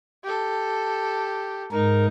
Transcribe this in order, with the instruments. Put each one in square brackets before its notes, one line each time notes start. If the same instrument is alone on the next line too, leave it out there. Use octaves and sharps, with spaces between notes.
[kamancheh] G4 A4
[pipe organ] G#2 A#4 [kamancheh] D#4